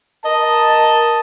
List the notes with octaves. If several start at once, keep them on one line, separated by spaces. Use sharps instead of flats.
A#4 D#5 A5